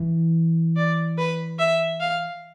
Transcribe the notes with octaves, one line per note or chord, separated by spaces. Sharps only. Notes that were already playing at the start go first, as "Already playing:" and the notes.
Already playing: E3
D5
B4
E5
F5